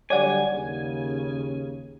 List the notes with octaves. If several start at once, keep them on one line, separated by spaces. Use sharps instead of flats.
D3 F#3 G3 C#5 D5 F#5 G#5
D#2 C#3